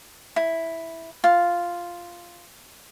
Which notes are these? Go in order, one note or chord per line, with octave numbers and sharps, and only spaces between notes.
E4
F4